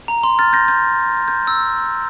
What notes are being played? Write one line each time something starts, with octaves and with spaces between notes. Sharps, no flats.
A#5
C6
F6 A6
G6 A#6
G6
G6
E6